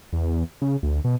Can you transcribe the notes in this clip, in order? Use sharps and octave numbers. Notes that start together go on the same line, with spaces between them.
E2
C#3
D2
B2